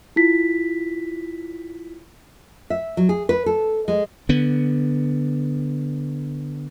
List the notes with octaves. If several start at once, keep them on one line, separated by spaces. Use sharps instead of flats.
E4 F4 B6
E5
F#3
G#4
B4
A4
G#3
D3 B3